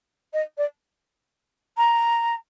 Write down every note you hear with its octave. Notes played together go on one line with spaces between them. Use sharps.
D#5
D5
A#5